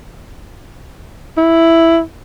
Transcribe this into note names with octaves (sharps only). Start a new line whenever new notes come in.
E4